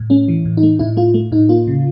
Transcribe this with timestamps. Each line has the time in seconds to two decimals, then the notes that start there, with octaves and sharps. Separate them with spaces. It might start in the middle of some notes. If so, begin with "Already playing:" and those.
Already playing: A2
0.10 A3 C#4
0.28 E3
0.45 A2
0.57 D#4
0.63 A3
0.79 A2 E4
0.97 A3 F4
1.14 A3
1.32 A2 D#4
1.49 A#3 F4
1.67 C#3